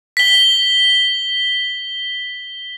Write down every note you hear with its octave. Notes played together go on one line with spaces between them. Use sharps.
B6 G7